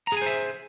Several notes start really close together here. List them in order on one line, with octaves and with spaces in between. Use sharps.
A#5 G#4 G#5 C5 E5